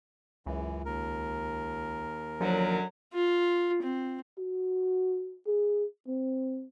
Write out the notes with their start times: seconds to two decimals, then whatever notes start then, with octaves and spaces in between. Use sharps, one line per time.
0.46 C#2 F#2 E3
0.85 D#2 A#4
2.40 F#2 D3 F3 F#3
3.13 F4
3.83 C4
4.38 F#4
5.47 G#4
6.08 C4